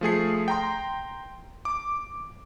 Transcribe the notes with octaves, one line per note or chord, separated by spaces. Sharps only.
F3 A3 G#4 C7
G5 A#5 C6
D6